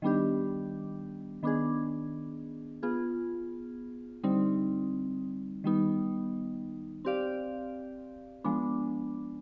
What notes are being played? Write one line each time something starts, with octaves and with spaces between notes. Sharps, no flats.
D#3 G3 B3 D4 G4
D#3 B3 D4 G#4
B3 F4 G#4
D3 G3 C4 D#4
D#3 G3 B3 D#4
C4 G4 D5 F5
F3 G#3 B3 D4